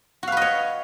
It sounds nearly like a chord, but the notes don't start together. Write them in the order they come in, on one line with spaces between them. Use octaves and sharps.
F#4 F5 B4 D#5 C#5